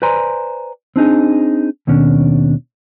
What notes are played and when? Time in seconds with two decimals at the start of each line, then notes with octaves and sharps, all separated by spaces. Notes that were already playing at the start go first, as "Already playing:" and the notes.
0.02 B4 C5 D5 G#5 A#5 C6
0.96 C4 D4 D#4 G#4
1.87 D#2 B2 D#3 C#4 D4